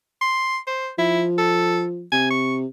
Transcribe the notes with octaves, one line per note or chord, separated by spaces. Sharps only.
C6
C5
F3 E4
A4
C3 G#5
C#6